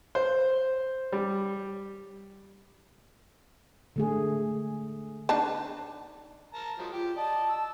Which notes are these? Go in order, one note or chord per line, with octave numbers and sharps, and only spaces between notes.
C5
G3
D3 A3 G#4
D4 D#4 A5
A#4 A5 A#5
F3 F#3 G#3
F4 G4
D5 D#5 A5
E6